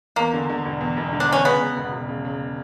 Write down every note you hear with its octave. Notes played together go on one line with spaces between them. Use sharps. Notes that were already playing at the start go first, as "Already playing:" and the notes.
E2 A#3
D3
D3
E1
E2
E1
D3
D4
E2 C#4
C#3 B3
C#3
E1
E1
C#3
C#3